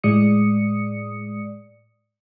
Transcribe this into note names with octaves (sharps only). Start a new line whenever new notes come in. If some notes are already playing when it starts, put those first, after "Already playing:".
A2 G#3 D5 D#6 C#7